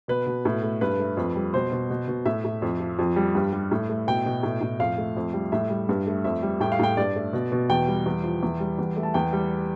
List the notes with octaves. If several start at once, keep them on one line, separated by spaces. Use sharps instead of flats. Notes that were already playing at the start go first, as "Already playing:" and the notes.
B2 B4
B2
A2
A3
G2 B4
A3
F2
G3
B2 C5
B2
B2
B2
A2 E5
A2
F2
F3
F2
G3
G2
G3
A2
A3
B2 G5
B2
A2
A2
F2 F5
A3
F2
G3
A2 E5
G3
G2
A3
F2 E5
G3
A2 G5
F5
A2 G5
G2 D5
A3
B2
B2
E2 G5
G3
E2
F3
E2
G3
E2
A3
A5
E2 G5
G3